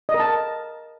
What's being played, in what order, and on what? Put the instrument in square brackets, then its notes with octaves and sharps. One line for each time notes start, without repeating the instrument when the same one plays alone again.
[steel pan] D#5
A#4
A5